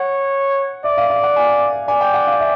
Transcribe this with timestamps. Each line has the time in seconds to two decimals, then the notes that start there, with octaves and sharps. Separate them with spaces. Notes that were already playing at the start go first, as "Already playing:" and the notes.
Already playing: C#5 F#5
0.84 D5 E5
0.98 F5
1.10 F5
1.23 F#5
1.36 G#5
1.88 D5 G#5
2.01 G5
2.14 F#5
2.27 F5
2.40 E5